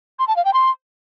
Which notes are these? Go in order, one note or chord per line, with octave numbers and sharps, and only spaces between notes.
C6
A5
F5
G5
C6